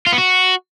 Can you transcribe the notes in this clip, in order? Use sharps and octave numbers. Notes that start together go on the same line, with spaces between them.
F4
B3
F#4